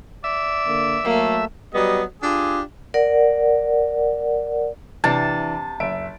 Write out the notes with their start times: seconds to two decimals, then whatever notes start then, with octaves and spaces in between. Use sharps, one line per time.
0.24 D5 E5
0.67 D3 A#3
1.05 F#3 A3 A#3
1.74 F#3 G3 B3 D#5
2.22 D4 F4 G4 G#4
2.94 A#4 D5 F#5
5.04 C3 E3 D4 A5
5.80 F#1 E5 D7